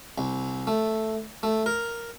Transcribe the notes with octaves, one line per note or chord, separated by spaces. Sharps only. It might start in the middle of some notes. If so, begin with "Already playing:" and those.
C2
A3
A3
A#4